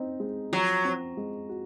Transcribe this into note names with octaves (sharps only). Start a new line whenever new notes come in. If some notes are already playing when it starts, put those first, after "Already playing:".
Already playing: C4 D#4
G#3
F3 F#3
C4
G#3
F#4